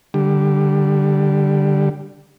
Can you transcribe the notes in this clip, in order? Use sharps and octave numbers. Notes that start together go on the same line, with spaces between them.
D3 G3